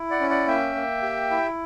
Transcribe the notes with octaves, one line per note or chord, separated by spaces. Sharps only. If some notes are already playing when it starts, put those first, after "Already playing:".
Already playing: E4
D5 F#5
C#4
D5 F#5
A#3 E5 G5
A#3
G4
E4